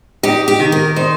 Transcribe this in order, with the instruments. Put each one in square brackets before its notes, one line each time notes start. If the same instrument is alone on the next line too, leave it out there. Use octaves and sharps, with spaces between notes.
[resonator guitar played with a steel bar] D#4 [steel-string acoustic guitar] G4
[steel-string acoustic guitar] G4
[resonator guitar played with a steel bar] D#3
[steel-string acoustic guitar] A#4
[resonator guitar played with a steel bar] D#4 [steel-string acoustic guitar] C5